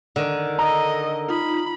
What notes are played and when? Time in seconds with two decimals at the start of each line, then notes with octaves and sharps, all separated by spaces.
0.16 D3 D#3
0.59 A4 D#5 A#5
1.29 D#4 F4 B5